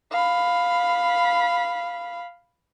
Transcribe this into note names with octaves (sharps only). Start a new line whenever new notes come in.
F5 B5